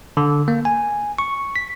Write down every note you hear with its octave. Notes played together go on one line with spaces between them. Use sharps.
D3
A#3
G#5
C#6
B6